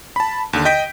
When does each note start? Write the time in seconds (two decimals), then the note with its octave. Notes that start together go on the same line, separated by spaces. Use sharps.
0.16 A5 B5
0.53 D#2 D3
0.65 D#5 G5 G6 B6 D7